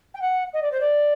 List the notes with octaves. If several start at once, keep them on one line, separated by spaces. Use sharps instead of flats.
G5
F#5
D#5
D5
C5
D5